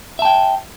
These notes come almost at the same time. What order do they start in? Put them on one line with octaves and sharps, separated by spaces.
E5 A5 G5